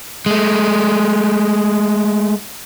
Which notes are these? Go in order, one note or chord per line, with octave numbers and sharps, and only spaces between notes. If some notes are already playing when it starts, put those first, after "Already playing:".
G#3 A3